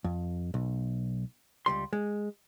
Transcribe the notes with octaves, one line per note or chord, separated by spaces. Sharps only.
F2
B1
C#2 G3 C6
G#3